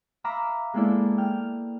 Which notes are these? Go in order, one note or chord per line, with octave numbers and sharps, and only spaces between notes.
E5 F5 A#5 B5 D6
G#3 A#3 B3 E4 A4 D5
G5 F6